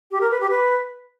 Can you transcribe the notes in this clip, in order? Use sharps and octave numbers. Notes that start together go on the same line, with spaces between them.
G4
A#4
B4
G4
B4